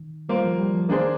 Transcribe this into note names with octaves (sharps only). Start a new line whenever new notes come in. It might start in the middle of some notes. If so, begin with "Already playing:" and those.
Already playing: D#3
G3 A#3 F4 C5
F3
G3
F3
D#3 A#3 D4 G#4 C5